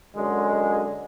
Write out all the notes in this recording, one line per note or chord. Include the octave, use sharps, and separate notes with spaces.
F#2 D3 G#3